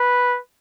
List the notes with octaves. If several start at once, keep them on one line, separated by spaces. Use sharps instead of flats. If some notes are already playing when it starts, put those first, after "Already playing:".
Already playing: B4